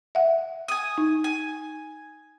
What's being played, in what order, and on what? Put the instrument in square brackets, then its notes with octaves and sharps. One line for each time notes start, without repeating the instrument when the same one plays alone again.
[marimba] E5 F#5
[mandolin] G#5 D#6
[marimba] D#4
[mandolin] G#5